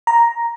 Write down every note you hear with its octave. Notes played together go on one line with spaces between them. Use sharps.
A#5